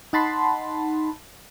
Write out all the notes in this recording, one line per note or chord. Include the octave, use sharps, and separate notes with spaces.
D#4 F#5 A5 B5 C6